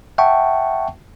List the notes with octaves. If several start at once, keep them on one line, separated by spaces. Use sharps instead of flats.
E5 F#5 G5 A5 C#6